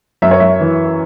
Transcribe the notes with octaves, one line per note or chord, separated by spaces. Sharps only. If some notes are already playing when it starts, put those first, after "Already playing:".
F#2 E5
C#5
F#2 E5
E3